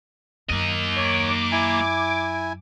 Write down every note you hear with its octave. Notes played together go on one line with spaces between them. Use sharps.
F#2 A#3 D#5
C#5 D6
E4 G#5